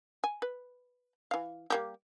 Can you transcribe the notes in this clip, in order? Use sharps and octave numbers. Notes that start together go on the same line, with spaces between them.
G#5
B4
E3 F5
G3 A#3 G4